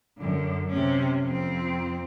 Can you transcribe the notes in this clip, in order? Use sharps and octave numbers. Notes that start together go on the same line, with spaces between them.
F#2 D3
C3 C#4
F2 C4